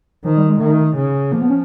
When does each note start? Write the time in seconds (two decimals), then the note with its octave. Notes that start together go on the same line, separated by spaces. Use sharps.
0.24 D#3 F3
0.37 G3
0.49 G#3
0.60 D#3 A3
0.96 C#3
1.31 F3 A#3
1.41 B3
1.49 C#4